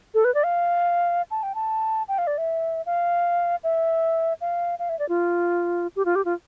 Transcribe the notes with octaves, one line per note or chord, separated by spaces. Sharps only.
A4
B4
D5
F5
A5
G5
A5
G5
F5
D5
E5
F5
E5
F5
F5
E5
D5
F4
G4
F4
G4
F4